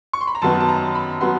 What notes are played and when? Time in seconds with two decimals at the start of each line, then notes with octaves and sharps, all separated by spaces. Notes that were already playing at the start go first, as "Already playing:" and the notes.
0.13 C#6
0.21 C6
0.27 B5
0.35 A#5
0.42 F#2 D#3 F#3 B3 A5
0.60 A5
0.68 A#5
0.95 B5
1.21 F#3 B3 C6